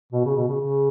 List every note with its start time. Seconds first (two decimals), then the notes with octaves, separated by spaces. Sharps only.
0.13 B2
0.25 C#3
0.37 B2
0.48 C#3
0.60 C#3